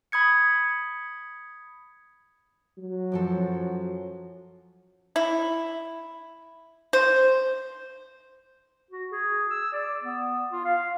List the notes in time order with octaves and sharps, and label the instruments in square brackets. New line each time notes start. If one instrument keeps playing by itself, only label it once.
[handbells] B5 D#6 G#6 C#7
[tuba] F#3
[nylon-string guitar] F#2 F3 A4
[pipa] E4
C5
[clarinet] F#4
G#4
E6
D5
B3
F4
F5